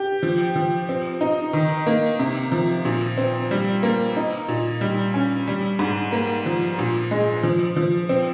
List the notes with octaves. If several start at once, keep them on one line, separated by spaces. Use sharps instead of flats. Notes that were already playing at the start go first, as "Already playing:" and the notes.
Already playing: G4
F3
F3
C4
D#4
D#3
A#3
C3
F3
A#2
C4
G3
A#3
D#4
A#2
G3
C#4
G3
G#2
A#3
F3
A#2
G#3
F3
F3
C4